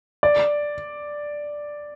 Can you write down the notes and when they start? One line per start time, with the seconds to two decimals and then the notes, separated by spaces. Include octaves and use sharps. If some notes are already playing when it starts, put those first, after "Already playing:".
0.23 D5